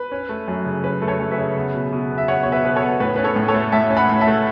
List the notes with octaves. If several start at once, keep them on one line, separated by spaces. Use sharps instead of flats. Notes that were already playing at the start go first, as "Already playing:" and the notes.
Already playing: B4
C#4
A3
F#2
C#3
C#4 B4
A3
A4 C#5
F#2
B4 E5
C#3
B3
B2
B2
B3
E5
B3 C#5 F#5
B2 C#5
B4 E5
B2 B4
A4 C#5
B3
A2 B4
C#4 B4
A4 C#5
A2
A4 C#5
A3
A2 E5 A5
C#4
F#5 B5
A2
E5 A5
A3